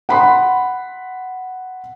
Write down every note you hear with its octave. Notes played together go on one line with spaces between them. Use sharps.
F#5 B5 C6